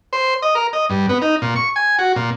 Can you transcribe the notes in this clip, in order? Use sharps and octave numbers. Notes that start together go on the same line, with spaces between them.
C5
D#5
A#4
D#5
G2
B3
D#4
A#2
C#6
G#5
F#4
A#2